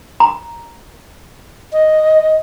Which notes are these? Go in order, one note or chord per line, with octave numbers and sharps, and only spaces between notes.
A#5
D#5